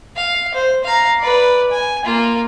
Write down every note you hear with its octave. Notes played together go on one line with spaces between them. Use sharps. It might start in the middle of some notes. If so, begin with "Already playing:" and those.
F5
C5
F5 A#5
B4 D5
G#5
A#3 F4